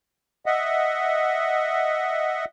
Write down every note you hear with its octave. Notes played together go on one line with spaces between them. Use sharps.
D#5 E5 F#5